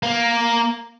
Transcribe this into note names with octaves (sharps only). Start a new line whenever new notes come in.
A#3